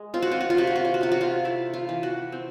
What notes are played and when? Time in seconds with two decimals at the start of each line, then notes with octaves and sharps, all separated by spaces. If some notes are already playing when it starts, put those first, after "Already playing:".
Already playing: G#3
0.14 C4 F4
0.22 F#4
0.31 F4
0.41 F#4
0.50 F4
0.57 C3 F#4
0.67 F4
0.76 F#4
0.85 F4
0.94 F#4
1.01 C3 F4
1.12 F#4
1.21 F4
1.45 A3 E4
1.74 F4
1.89 E3
2.03 F#4
2.32 C4